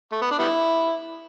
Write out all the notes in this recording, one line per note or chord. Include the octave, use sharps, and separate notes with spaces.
A3
B3
D4
G3 B3 E4